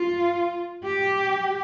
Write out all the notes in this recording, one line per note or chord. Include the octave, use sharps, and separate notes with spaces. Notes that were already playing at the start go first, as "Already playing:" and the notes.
Already playing: F4
G4